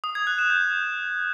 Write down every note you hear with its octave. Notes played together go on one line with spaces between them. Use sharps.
D#6
G#6
F#6
E7
G6